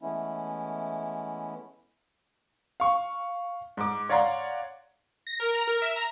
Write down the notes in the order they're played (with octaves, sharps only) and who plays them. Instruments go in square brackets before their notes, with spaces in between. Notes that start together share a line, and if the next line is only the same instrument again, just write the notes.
[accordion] E3 G#3 A3 B3 C#4 E4
[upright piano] F5 C#6
G#2 D6
C#5 D5 F5 F#5 A#5 C6
[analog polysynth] A#6
A#4
A#5
A#4
E5
A#5